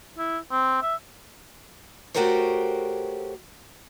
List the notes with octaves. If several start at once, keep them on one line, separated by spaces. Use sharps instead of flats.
E4
C4
E5
A3 F#4 G4 A#4 C5 C#5